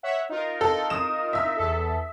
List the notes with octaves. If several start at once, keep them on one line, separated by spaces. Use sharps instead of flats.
C#5 E5 F#5
D#4 F4 A#4
A4
D#6 E7
E5 E6
E2 A4